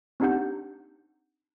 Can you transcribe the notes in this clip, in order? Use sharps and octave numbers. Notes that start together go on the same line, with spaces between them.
C4 D4 D#4 G4 F#5 G6